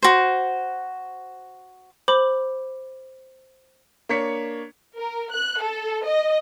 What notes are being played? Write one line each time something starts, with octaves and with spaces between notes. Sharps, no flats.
F#4 C5
C5 B5 D6 G6 F#7
A#3 D4 C#5 B6 C#7
A#4
F#6
A4
D#5